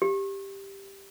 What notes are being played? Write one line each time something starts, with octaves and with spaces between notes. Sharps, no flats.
G4